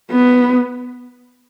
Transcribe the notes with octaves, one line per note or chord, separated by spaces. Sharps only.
B3